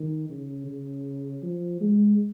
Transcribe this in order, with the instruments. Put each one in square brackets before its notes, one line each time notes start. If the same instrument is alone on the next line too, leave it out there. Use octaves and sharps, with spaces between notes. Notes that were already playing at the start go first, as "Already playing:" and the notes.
Already playing: [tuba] D#3
C#3
C#3
F3
G#3